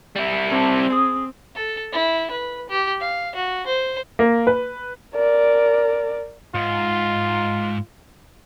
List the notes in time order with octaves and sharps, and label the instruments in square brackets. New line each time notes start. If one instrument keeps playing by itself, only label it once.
[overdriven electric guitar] G3 E4
[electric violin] C4 [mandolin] D4 A4 C#5
[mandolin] G#4 D#6
[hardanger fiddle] A4
E4
B4
G4
F5
F#4
C5
[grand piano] A#3
B4
[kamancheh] A#4 D5
[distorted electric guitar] G#2 [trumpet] F4